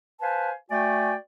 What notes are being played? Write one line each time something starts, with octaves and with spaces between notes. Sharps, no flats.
B4 C5 F5 G#5 A5
A3 F#4 D5 G5 G#5